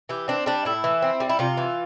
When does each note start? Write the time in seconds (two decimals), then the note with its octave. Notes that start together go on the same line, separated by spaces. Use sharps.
0.09 E3 G4
0.28 C4 D4
0.46 G3 D4
0.65 A2 E4
0.84 E3
1.02 C4
1.20 G3
1.29 E4
1.39 C3 F4
1.57 E3